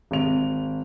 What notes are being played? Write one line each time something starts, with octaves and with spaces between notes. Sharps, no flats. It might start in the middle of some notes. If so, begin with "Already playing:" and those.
G#1 F7